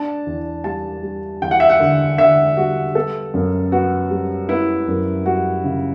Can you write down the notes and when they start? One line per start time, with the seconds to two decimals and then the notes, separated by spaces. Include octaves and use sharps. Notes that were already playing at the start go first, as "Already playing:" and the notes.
Already playing: D4 A5
0.26 E2
0.64 G3 A5
1.03 G3
1.42 E2 G5
1.51 F#5
1.60 E5
1.70 F#5
1.80 D3
2.18 D3 E5
2.57 G3 F#4
2.95 B3 A4
3.34 F#2
3.72 B3 F#4
4.10 G3
4.49 B3 E4
4.87 F#2
5.26 G3 F#4
5.64 C#3